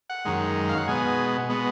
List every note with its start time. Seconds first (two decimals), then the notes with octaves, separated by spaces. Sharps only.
0.10 F#5
0.25 F#2 D#3 G#3
0.69 F5
0.78 F#5
0.87 B2 G#3 B3 G#5
1.50 B2 G#3 B3